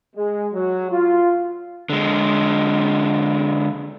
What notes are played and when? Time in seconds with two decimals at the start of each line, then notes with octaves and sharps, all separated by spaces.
0.16 G#3
0.53 F#3
0.90 F4
1.90 D3 G#3